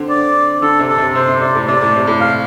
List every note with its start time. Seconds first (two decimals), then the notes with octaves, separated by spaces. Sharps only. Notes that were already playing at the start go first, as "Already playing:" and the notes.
Already playing: D3 C4
0.09 D5
0.62 D3 A4
0.79 C3
0.89 A4
0.98 C3
1.15 C3 C5
1.28 C3
1.41 C3 D5
1.55 A2
1.67 C3 D5
1.81 A2
1.95 C3
2.07 A2
2.21 F5